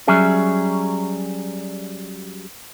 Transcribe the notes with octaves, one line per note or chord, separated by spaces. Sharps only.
F#3 G3 C#4 G#4 E5